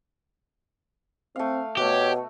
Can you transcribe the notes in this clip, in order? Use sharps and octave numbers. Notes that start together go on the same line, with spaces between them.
A3 C4 F5
B2 A3 F#4 G4 C#5